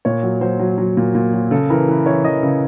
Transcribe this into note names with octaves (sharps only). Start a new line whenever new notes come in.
A#2 C#5
F#3
F#3 C5
F#3
F#3
A#2
A#2
F#3
C#3 A4
E3 A#4
E3 B4
E3 C#5
E3 D#5
C#3